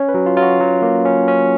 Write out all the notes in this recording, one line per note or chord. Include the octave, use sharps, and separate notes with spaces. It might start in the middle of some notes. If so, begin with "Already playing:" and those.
Already playing: C#4 C#5
B4
F#3
F4
F#3 F4
F#4
F#3
A#3
C#4
C#4